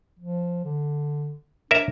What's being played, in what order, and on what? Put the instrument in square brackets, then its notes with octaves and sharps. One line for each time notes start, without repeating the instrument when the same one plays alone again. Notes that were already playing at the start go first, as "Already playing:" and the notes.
[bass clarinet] F3
D3
[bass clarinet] D4 [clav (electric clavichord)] A#4 C#5 E5